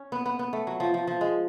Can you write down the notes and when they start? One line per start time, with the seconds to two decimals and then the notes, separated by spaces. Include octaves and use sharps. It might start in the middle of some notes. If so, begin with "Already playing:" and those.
Already playing: C#4
0.12 B3
0.26 B3
0.39 B3
0.53 A3
0.67 F#3
0.80 F3
0.94 F3
1.07 F3
1.21 G#3